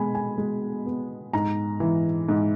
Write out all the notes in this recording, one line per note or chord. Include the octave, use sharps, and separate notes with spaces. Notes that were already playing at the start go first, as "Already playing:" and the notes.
Already playing: B2 G#3 G#5 B5
G#5
G#3
B3
G#2 A#5
E3
G#2